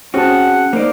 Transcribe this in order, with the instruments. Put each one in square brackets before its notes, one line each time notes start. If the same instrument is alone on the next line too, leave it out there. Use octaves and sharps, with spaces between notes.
[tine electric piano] C4 G#4 A5 [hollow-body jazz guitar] C#4 F#4 [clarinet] F#5
[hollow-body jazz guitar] A#3 D#4 D5 [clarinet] C5